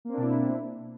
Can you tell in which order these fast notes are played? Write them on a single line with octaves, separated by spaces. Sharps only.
A#3 C4 D4 B2 E4